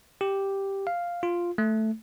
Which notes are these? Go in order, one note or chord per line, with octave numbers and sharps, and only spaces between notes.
G4
F5
F4
A3